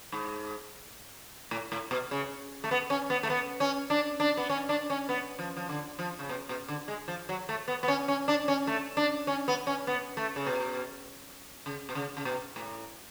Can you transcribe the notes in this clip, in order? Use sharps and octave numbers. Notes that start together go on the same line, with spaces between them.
G#2
A2
A2
B2
C#3
A3
B3
C#4
B3
A3
B3
C#4
D4
D4
B3
C#4
D4
C#4
B3
F3
F3
D3
F3
C#3
B2
B2
D3
G#3
F3
F#3
A3
B3
B3
C#4
C#4
D4
C#4
A3
D4
C#4
B3
C#4
B3
A3
C#3
B2
C#3
B2
C#3
C#3
B2
A2